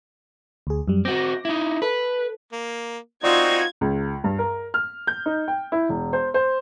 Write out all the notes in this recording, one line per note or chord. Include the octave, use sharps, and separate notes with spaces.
D2 G#4
F#2 G3
C4 F#4 D6 A#6
D#4 E4
A4 B4
A#3
C4 D#4 F4 F#4 D5 C#6 G#6
C#2
G2
A#4
F6
G6
D#4
G5
E4
E1
C5
C5